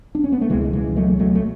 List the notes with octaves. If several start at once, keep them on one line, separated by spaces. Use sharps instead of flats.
D4
C#4
B3
A3
C#2 B2 E3 G#3
E3 G#3
F#3 A3
F#3 A3
A3